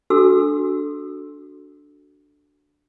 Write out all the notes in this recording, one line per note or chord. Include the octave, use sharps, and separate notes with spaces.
D4 F#4 A4 E6